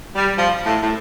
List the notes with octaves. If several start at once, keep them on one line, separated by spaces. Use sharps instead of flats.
G3
F3
A2
A2